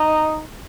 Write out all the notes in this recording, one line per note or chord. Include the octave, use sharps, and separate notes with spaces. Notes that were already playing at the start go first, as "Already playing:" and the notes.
Already playing: D#4